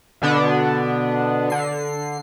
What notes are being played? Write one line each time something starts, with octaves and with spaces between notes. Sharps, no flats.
B2 D3 B3 D4
D3 C7